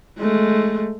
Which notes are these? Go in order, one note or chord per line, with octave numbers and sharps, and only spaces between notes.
G#3 A3